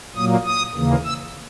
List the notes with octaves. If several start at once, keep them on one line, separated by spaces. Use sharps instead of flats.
A#2 F#3 A#3 D#6
D#6
D#2 C#3 E3 A#3
E6